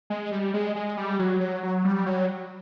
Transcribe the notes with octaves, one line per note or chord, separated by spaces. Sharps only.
G#3
G3
G#3
G#3
G3
F#3
F#3
F#3
G3
F#3